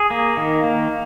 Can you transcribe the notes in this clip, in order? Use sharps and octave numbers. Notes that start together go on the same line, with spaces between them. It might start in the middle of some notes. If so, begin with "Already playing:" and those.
Already playing: G#4
A#3
D#3
A#3